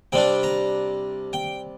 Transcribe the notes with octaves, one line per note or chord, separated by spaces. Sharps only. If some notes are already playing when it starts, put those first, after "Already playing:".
C3 G3 D4 G5
A#5
G5